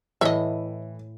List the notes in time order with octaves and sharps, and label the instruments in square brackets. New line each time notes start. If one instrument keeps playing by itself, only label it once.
[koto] A2 [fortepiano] E3 [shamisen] D#5 E5